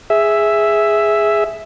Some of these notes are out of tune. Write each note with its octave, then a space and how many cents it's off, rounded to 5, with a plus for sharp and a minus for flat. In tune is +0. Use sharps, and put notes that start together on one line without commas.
G#4 +0 E5 +0